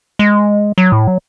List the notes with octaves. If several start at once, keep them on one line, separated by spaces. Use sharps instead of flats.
G#3
F#3
A2
F#3